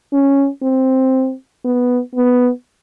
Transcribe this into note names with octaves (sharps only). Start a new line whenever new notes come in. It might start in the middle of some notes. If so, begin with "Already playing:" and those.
C#4
C4
B3
B3